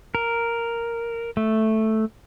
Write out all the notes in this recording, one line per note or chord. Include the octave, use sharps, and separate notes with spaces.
A#4
A3